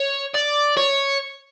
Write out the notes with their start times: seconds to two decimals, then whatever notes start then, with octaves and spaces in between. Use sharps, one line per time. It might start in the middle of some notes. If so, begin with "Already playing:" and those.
Already playing: C#5
0.34 D5
0.77 C#5